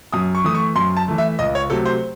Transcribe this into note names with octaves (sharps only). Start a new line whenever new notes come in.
F#2 D#6
C#6
E3 A3 D#6
C#6
F#2 C6
A5
E3 A3
E5
C#2 D#5
C#5
C3 F#3 A3 A4
C5